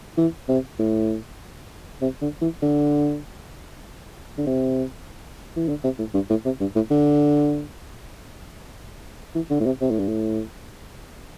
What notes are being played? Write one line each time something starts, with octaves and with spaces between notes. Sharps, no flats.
E3
C3
A2
C3
D3
E3
D3
D3
C3
E3
D3
C3
A2
G2
A2
C3
G2
A2
D3
E3
D3
A2
C3
C3
A2
G2
A2